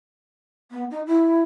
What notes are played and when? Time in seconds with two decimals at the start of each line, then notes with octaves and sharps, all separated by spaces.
0.71 B3
0.91 D#4
1.07 E4